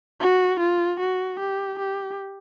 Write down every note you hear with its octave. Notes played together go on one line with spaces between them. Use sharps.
F#4
F4
F#4
G4
G4